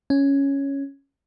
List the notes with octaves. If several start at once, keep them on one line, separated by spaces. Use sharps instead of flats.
C#4